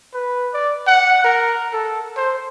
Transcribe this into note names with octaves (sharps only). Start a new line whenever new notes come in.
B4
D5
F#5
A#4
A4
C5